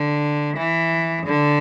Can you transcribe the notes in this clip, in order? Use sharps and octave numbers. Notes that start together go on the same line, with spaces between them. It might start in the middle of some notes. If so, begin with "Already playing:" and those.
Already playing: D3
E3
D3